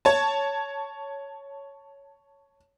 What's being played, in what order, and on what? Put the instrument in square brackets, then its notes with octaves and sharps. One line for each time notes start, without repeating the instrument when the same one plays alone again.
[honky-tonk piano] C#5 A5